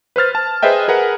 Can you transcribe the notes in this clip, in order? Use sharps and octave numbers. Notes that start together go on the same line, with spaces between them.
B4 C5 F6 A6
A5
G#4 B4 C5 D#5 E5 G5
G#4 A#4 B4 F#5